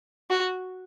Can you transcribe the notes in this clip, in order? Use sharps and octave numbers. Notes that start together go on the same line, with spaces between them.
F#4